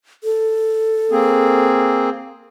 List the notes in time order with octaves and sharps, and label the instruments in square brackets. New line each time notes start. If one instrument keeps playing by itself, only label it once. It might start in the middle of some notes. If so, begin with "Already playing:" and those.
[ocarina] A4
[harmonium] A#3 C4 G#4